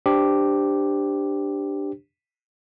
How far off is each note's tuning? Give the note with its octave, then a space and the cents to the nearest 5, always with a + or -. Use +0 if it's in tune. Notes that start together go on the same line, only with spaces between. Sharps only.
D4 +5 G4 +0 C5 -10